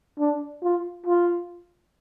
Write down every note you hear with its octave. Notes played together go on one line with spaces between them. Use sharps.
D4
F4
F4